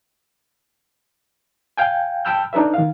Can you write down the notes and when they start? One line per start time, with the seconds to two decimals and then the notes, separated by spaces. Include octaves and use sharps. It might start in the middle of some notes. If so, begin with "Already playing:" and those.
1.77 F5 G5 G#5
2.25 G5 A5 B5 E6 F6 G6
2.53 D4 D#4 A4 B4 E5
2.74 D#3 F5